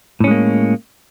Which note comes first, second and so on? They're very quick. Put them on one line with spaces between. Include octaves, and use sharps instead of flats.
A2 C#4 G#3 A#3